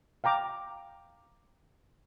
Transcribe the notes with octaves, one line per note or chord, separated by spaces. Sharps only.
F5 G5 A#5 D6